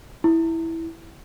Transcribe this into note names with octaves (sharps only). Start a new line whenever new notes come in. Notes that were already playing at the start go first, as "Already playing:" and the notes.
E4